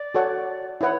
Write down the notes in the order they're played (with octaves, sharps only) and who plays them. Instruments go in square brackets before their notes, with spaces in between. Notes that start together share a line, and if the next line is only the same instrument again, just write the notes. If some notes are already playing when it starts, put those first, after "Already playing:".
Already playing: [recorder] D5
[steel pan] F#4 A4 C#5 F#5
[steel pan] E4 B4 F#5 [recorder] C#5